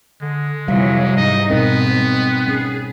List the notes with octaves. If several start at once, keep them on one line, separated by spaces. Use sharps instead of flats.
D3 G#3
F2 C3 E3 F#3 G3 F5
G#2 D#4 D#5
G#2 B2 B3 C4 D#4 A#4
C#4 G#4